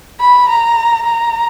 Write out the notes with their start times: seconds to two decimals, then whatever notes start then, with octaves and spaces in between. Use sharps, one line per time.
0.20 B5
0.49 A#5
1.06 A#5